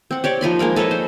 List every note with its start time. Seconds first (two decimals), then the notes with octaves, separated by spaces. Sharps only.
0.11 C4 F#5
0.24 G4 C#5 D5
0.41 F3 D#4 B5 C6
0.59 G#3 A#3 A#4 B5
0.76 A4 B4 C#5 D#5
0.91 C5